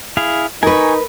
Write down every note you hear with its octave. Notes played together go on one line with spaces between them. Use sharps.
E4 G#4 F5
D#4 A#4 B4 G#5 C#6